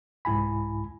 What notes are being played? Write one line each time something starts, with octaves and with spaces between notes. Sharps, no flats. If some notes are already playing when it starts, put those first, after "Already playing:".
C2 G#2 E4 G#5 B5